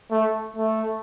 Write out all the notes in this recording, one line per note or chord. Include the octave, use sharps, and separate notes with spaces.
A3
A3